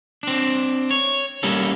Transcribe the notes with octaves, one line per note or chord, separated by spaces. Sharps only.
C4 D4
C#5
G3 A#3 C#4 A4